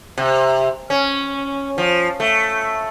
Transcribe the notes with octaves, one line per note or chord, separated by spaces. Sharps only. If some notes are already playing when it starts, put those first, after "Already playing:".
C3
C#4
F3
A3